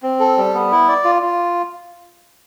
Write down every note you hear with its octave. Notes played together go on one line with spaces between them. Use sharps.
C4
A4
G3
B3
E4
D5
F4
F4